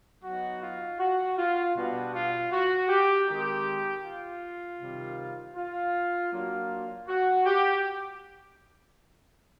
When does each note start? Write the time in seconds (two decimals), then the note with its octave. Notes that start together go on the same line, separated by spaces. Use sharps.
0.23 F#3 B3 D#4 F#4
0.62 F4
0.99 F#4
1.37 F4
1.75 B2 G3 B3 D4 F#4
2.14 F4
2.52 F#4
2.89 G4
3.27 D#3 G#3 C4 D#4 G4
4.03 F4
4.80 C3 D#3 G3
5.56 F4
6.32 F#3 A#3 D4 F4
7.07 F#4
7.45 G4